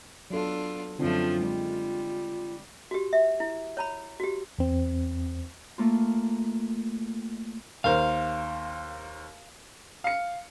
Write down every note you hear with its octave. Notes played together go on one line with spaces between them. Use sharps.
F#3 B3 D4 F4 A4
F#2 D3 F3 A3 C4 D4 F4
G3 G#3
F#4 G4
E5
E4
C#5 A#5 B5
F#4 G4
E2 C4
A3 A#3 F4
D#2 A#4 C5 F5
F5 C#7